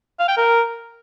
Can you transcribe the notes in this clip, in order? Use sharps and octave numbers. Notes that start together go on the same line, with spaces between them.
F5
G5
A#4